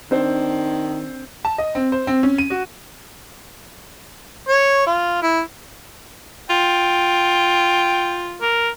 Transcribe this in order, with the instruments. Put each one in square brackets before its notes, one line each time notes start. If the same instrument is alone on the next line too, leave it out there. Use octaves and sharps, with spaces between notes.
[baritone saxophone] D#3 [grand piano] C4 D4 C5
[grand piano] A5
D#5
C4
C5
C4
C#4
D#7
F#4
[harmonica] C#5
F4
E4
[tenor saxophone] F4 [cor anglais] G5
[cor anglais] A#4